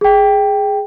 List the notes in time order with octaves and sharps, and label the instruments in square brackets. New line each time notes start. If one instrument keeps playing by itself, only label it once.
[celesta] G#4 G5